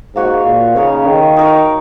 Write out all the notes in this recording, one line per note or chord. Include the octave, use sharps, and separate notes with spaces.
G#2 A#3 F#4 C#5
A#2
C#3 D#4 A#4 C#5
D#3
D#4 A#4 C#5